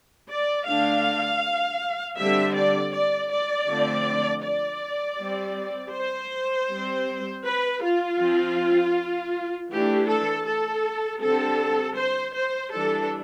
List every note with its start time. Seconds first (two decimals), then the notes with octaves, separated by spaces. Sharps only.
0.28 D5
0.66 D3 A3 D4 F5
2.17 D3 G3 C4 E5
2.55 D5
2.92 D5
3.30 D5
3.67 D3 F3 A3 C4
4.43 D5
5.18 G3 C4
5.94 C5
6.69 G3 C4
7.44 B4
7.82 F4
8.19 F3 C4
9.70 E3 A3 D4 G4
10.08 A4
10.46 A4
11.20 D3 G3 C4 A4
11.96 C5
12.33 C5
12.71 E3 G3 D4 A4